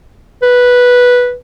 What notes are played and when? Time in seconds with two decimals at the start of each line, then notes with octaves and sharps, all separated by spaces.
0.42 B4